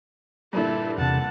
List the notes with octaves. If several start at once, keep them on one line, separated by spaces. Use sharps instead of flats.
G2 A#2 D3 E4 A4
E2 C3 F#5 A5